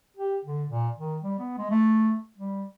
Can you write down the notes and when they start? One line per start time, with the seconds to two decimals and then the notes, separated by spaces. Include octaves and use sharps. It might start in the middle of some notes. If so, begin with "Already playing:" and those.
0.17 G4
0.45 D3
0.68 A#2
0.97 D#3
1.23 G3
1.39 B3
1.58 G#3
1.70 A3
2.38 G3